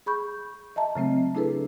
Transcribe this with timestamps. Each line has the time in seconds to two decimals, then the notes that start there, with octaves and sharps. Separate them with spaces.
0.06 G#4 B5 C#6 G6
0.76 D#5 E5 A5 A#5
0.96 C#3 F#3 A3 C4
1.34 A3 D4 E4 G#4 A4 B4